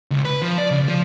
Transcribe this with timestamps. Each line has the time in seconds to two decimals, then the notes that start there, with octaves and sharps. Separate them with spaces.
0.11 C#2
0.25 B4
0.42 F3
0.58 D5
0.71 C#3
0.88 F3